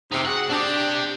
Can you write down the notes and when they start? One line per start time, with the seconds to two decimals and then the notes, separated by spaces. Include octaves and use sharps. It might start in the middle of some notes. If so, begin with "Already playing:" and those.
0.12 C3 D#4 G4
0.25 F#4 G#4 F#5
0.50 C4 D4 G4